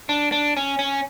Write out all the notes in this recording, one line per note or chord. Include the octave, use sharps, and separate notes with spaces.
D4
D4
C#4
C#4